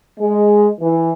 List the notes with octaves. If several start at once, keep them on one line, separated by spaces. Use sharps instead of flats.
G#3
E3